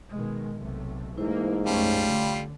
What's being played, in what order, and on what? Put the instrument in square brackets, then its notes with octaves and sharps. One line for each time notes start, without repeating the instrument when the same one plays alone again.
[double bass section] B2 D#3 G#3
B1 C3 A3
[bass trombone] G#2 [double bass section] E3 A3 A#3 [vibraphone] E4 C5
[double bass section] B1 F#2 C#4 [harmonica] G3 F4 [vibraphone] A3
[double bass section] D3